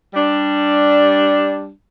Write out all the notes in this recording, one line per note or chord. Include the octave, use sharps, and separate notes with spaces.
G3 D4